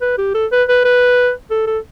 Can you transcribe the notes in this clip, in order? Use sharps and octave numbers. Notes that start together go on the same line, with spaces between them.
B4
G4
A4
B4
B4
B4
A4
A4